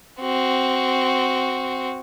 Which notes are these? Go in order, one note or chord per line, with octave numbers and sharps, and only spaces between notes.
C4 F#4